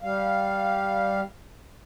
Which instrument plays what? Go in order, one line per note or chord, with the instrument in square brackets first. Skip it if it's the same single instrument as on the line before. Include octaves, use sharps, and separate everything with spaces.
[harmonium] G3 F5